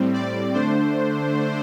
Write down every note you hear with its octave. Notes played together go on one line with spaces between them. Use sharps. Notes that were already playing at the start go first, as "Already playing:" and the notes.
Already playing: A2 G3 C4
D5
D3 A3 D4 C5